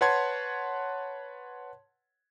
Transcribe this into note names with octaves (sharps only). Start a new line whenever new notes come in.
B4 C#5 F#5 A5 C6 G#6